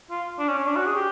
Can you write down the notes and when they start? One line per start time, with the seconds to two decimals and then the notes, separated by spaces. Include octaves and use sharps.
0.10 F4
0.39 D4
0.48 C#4
0.58 C#4
0.67 D4
0.76 F#4
0.86 G#4
0.95 G4